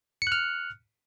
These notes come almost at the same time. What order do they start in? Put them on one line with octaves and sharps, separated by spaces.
C#7 F#6 F6